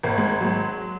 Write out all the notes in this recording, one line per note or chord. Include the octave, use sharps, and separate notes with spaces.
G#1 A#3
G#3
F#3 G#3